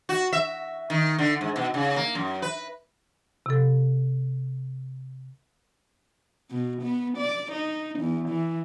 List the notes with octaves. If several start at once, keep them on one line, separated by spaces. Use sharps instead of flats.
F#4
E5
D#3
D3
G#2
B2
C#3
A#3
F#2
B4
C3 A4
B2
B3
D5
D#4
E2
E3